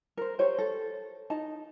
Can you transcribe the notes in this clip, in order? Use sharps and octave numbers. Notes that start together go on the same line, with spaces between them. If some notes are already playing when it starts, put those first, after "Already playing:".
A#4 C5
G4 C5 C#5
A4
D#4 A5